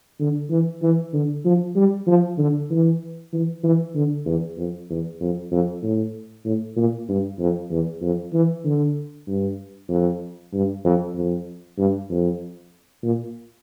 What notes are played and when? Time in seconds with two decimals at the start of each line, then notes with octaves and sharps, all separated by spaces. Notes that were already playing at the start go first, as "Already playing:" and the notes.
0.20 D3
0.50 E3
0.82 E3
1.13 D3
1.45 F3
1.76 G3
2.07 F3
2.39 D3
2.71 E3
3.33 E3
3.64 E3
3.95 D3
4.26 E2
4.58 F2
4.90 E2
5.21 F2
5.52 F2
5.83 A2
6.45 A2
6.77 A#2
7.09 G2
7.40 F2
7.71 E2
8.02 F2
8.33 E3
8.65 D3
9.27 G2
9.90 F2
10.53 G2
10.85 F2
11.16 F2
11.78 G2
12.10 F2
13.03 A#2